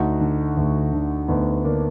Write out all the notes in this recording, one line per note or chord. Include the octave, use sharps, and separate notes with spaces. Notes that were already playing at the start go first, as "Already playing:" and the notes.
Already playing: D2 D#4 F#4
D3
D2
D3
D2 B3 D#4
D3 A#3 D4